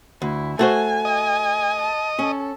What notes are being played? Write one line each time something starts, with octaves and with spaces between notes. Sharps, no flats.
D2 E4
A3 F#4 C5 G#5
D#5
A5
C#4 A4